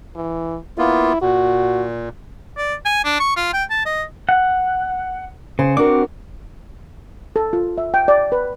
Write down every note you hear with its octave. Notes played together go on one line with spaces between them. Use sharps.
E3
A#3 B3 E4 F4
A#2 F#4
D5
G#5
D4
C#6
F4
G5
A5
D#5
F#5
C#3 C5
C4 D4 F#4 A#4 D6
A4
F4
E5
G5
D5
B4